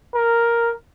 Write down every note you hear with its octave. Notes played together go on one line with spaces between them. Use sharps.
A#4